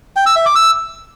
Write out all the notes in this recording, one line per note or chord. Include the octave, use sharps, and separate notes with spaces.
G5
E6
E5
D6
E6